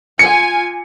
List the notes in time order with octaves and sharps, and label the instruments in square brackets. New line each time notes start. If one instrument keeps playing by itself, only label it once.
[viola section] F4 G#5 [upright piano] C#7